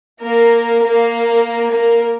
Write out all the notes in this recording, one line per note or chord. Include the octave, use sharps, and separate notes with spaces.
A#3 A#4
A#3 A#4
A#3 A#4